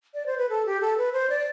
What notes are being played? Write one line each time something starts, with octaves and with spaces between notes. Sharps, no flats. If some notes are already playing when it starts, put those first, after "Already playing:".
D5
C5
B4
A4
G4
A4
B4
C5
D5